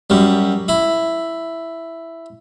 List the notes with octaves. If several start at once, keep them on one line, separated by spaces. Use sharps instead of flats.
F#2 G3
E4